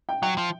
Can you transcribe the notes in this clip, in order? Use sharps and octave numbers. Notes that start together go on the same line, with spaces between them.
G5
F#3 G5
F3